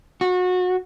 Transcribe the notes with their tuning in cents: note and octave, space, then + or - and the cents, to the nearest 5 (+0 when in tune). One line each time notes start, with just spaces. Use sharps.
F#4 -30